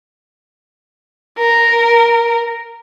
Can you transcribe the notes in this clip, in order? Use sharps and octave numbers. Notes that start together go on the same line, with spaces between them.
A#4